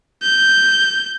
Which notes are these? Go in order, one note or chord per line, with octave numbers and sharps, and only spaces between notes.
G6